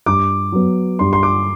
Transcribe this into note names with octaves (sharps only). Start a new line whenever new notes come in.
G2 D6
F#3 B3
G2 C6
C6
D6